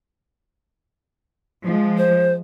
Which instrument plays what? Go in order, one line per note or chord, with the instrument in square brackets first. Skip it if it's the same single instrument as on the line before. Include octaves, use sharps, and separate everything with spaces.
[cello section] F3 G#3
[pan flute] C5